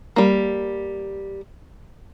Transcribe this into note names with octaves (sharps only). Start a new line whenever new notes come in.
G3 A#3